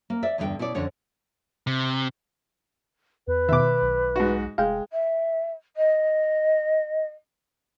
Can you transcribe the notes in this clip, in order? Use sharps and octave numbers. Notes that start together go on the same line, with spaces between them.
A#3
D5 E5
E2 G2 D3 F5 G5
B2 E4 C#5 D5
F2 D3 D4 C#5 F#5
C3
E2 B4
B2 D#3 E5 D6
B1
G#2 F#4
F1 G#3 F5 G5
E5
D#5